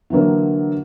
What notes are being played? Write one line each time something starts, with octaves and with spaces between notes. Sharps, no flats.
D3 E3 F#3 A#3